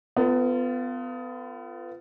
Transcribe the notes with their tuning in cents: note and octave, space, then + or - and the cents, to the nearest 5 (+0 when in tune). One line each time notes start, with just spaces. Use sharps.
B3 +30 F4 -15 A#4 -40